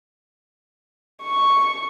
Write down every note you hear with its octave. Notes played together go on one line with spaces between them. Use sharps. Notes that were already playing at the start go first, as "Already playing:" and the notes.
C#6